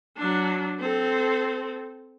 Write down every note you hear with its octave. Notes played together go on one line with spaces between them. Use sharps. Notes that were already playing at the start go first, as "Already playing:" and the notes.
F#3 D4
C4 A4